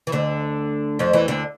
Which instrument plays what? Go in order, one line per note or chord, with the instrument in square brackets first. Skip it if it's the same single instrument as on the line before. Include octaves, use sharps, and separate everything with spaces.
[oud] E3
D2 D3
F2 F3
E2 E3
D2 D3